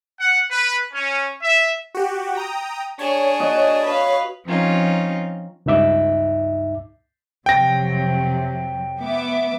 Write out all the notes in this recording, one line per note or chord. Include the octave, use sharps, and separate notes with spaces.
F#5
B4
C#4
E5
F#4 G4
G5 A#5 D#6
D4 G#4 C#5
F#4 D#5
B4 F5
F3 C4 C#4 D#4 F4
C#2 G2 D#4 E5 D6
F2 C3 F#3 G5 A#6
B3 E5 D6